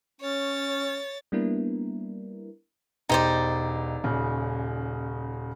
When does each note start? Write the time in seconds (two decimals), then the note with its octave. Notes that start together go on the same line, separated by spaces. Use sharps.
0.21 C#4 C#5 A6
1.32 G3 A#3 B3 D4 E4 A#4
3.09 E1 D#4 G4 C5 D5
4.04 D#1 C#3